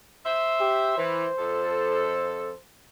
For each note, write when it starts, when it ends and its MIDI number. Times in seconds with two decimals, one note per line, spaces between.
0.26 0.95 72
0.26 0.95 76
0.60 0.93 67
0.97 1.26 52
0.97 2.59 72
1.39 2.51 41
1.39 2.51 69